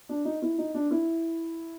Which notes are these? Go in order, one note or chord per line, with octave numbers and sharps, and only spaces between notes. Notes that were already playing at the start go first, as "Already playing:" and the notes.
D4
D#4
E4
D#4
D4
E4